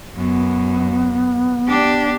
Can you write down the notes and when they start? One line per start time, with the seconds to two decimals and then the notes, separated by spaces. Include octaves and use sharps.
0.16 F#2 B3
1.68 D4 G4